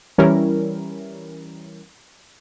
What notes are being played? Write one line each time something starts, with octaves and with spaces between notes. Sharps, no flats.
E3 G3 C#4 E4 A#4